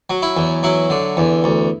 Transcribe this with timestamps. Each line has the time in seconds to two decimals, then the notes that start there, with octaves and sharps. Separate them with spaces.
0.10 F#3
0.22 E4
0.37 E2
0.63 F#3 E4
0.90 D3
1.17 E2
1.44 D2